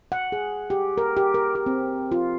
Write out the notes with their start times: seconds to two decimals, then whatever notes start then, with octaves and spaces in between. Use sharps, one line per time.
0.12 F#5
0.32 G#4
0.70 G4
0.98 A#4
1.17 G4
1.34 A#4
1.55 G4
1.66 C4
2.12 F4